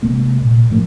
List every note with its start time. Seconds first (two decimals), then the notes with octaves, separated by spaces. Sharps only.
0.03 C3 G#3 A#3
0.42 A#2
0.70 A2 F3 A3 A#3